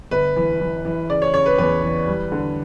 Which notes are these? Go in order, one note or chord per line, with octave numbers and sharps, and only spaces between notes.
G1 B4
E3
E3
E3
C#3 D5
C#5
C#3 C#5
B4
E2 B4
E3
G3
D3